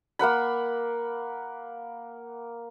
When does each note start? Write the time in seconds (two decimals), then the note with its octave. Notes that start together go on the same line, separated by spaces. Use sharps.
0.19 A#3 A#4 F#5 B5